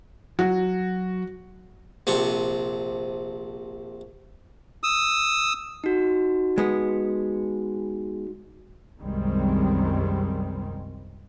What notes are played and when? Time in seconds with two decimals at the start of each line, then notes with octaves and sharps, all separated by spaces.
0.39 F#3 F#4
2.07 A#1 C3 D4 C#6
4.83 D#6 E6
5.84 D#4 F#4
6.58 G#3 B3
8.99 C2 F#2 D#3 G3 G#3 C4